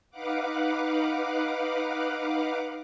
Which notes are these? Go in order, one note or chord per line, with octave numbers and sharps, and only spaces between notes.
D#4 B4 F5 F#5 D6